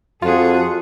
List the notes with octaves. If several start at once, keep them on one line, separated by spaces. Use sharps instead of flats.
F2 F4 F#4 G#4 A4